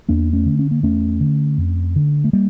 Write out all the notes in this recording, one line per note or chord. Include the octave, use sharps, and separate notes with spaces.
E2 A#3 D4
A3 C#4
D3
C#4
A#3
E2 A3 C#4
D3
F2
D3
A3
G3 A#3